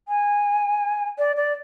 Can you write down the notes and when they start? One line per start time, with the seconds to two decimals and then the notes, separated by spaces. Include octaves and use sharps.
0.08 G#5
1.18 D5
1.36 D5